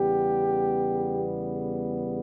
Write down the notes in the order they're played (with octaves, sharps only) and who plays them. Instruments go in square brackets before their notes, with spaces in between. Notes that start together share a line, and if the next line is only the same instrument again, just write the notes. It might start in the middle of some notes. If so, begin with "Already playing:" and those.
Already playing: [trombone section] E2 C#3 G3 B3 G4